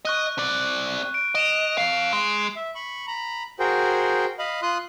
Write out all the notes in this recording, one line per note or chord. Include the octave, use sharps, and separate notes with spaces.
D#5 C#6 F#6 D#7
C4 D5
D7
D#5 D7 E7 F7
C4 F5 C7
G#3
E5
B5 C#6
A#5 B5
F#4 G#4 A#4 C5 G5
D#5 F5 B5
F4 C6 D#6 F#6